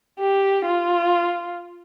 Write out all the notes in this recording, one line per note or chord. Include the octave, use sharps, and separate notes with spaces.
G4
F4